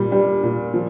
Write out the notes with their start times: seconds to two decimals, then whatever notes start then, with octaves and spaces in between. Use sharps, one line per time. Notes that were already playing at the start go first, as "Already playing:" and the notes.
Already playing: A#2 G3
0.12 G3
0.43 A#2
0.74 F3